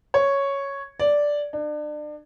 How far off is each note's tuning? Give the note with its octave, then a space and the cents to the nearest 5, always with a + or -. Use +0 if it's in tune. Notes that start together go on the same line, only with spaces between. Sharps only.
C#5 +0
D5 -5
D4 +35